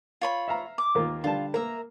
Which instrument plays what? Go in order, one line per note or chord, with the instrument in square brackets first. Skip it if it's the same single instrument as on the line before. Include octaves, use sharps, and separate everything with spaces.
[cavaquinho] F4 C#5 B5
[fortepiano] E5 F5 A#5
[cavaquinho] D6
[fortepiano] D#2 A#3 F4
[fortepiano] D3 G3 A5 [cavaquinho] F4
[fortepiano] A#3 [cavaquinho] E5 A#5